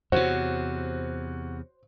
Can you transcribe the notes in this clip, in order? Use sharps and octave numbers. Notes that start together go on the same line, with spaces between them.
E2 C3 F#4 C5 C#5